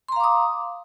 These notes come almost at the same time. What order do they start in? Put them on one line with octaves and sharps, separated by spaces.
C6 A#5 F5 D6 D#6